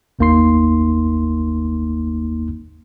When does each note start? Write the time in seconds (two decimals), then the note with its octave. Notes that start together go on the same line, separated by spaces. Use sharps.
0.19 G1 D#2 A#3 D#4 C6 C7